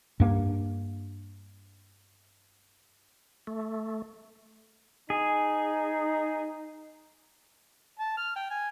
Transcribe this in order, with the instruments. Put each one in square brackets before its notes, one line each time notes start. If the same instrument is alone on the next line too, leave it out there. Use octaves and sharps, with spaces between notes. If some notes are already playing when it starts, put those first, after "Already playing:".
[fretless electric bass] G2 A#3 C#4 D4
[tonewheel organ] A3
[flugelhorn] D#4 [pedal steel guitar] G#4
[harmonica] A5
F6
G5
G#5